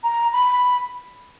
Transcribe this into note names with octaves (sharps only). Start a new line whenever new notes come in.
A#5
B5